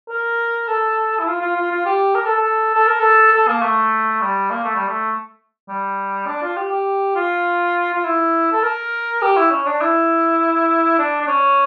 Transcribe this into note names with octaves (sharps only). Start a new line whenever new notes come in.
A#4
A4
E4
F4
F4
F4
F4
G4
A#4
A4
A4
A4
A#4
A4
A4
A#3
A3
G3
A#3
A3
G3
A3
G3
D4
F4
G4
G4
F4
F4
E4
A4
A#4
G4
E4
C#4
D4
E4
D4
D4
C#4